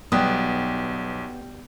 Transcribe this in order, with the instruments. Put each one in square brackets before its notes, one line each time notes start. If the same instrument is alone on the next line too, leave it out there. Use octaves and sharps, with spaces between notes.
[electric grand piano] B1 D#6 [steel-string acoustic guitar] G3 G5 [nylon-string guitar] B3